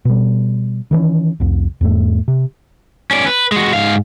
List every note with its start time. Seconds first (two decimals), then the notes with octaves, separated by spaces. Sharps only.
0.05 B2 G3
0.91 D#3 E3 A3 C#4
1.40 C2 F2
1.81 E2 G#2 A3
2.28 C3
3.11 C#4 D5
3.26 B4
3.52 G#3 F#4
3.74 G#2 F5